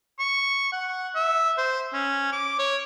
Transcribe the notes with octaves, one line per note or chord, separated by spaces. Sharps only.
C#6
F#5
E5
C5
C#4
D6
C#5